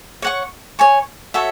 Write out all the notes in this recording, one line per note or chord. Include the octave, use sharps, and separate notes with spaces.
C#5 F#5 C#6
C#5 G#5 C#6
F#4 A4 C#5 E5